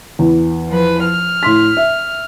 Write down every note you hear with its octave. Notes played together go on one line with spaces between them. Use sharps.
E2
F3 B4
F6
A2 C6 B6
E5